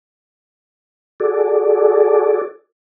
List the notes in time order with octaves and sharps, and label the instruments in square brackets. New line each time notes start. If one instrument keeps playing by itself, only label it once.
[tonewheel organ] F#4 G#4 A4 D5